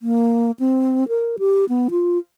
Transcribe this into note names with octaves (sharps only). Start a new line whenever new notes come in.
A#3
C4
A#4
G4
B3
F4